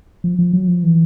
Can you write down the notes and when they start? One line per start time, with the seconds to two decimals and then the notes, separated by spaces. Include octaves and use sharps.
0.24 F3
0.39 F3
0.53 F#3
0.68 F3
0.83 E3